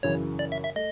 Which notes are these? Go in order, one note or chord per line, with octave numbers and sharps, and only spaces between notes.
F#2 C#3 E3 C#5
D5
E5
E5
A3 D#5